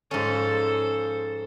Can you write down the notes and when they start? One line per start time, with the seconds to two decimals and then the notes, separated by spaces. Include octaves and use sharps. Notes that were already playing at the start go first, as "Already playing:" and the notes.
0.11 G#2 F3 C#4 A4 C5